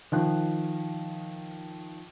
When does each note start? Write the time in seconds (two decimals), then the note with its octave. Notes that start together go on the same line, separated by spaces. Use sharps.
0.12 D#3 F3 F#6